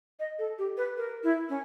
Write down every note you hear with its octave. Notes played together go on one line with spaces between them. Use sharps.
D#5
A4
G4
B4
A#4
E4
C#4